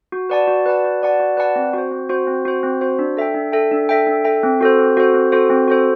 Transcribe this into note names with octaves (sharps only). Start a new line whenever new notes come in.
F#4
B4 D5 F#5 A5
F#4
B4 D5 F#5 A5
F#4
B4 D5 F#5 A5
F#4
B4 D5 F#5 A5
C4
F#4 C5
C4
F#4 C5
C4
F#4 C5
C4
F#4 C5
D4
A4 E5 G5
D4
A4 E5 G5
D4
A4 E5 G5
D4
A4 E5 G5
C4
F#4 A4 C5
C4
F#4 A4 C5
C4
F#4 A4 C5
C4
F#4 A4 C5